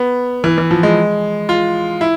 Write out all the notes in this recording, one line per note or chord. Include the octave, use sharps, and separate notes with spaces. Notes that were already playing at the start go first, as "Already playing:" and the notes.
Already playing: B3
E3
E3
F3
G#3
F4
E4